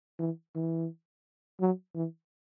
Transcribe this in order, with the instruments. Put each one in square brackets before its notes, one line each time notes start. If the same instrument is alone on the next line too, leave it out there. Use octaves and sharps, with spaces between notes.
[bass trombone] E3
E3
F#3
E3